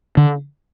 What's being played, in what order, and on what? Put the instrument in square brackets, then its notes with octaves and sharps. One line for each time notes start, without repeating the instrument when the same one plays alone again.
[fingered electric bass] D3